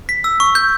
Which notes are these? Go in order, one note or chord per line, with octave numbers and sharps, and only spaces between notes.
B6
E6
C#6
G6